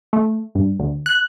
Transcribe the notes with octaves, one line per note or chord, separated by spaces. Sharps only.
A3
G2
D2
F#6